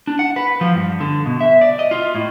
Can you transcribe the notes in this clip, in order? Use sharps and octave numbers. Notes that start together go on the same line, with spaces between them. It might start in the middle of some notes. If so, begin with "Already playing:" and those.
D4
F#5
B4
F3
G2
D3
B2
E5
D5
D#5
F4
A2